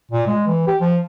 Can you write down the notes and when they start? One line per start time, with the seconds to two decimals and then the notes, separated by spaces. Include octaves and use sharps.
0.12 A#2
0.27 G#3
0.47 E3
0.67 G4
0.81 F3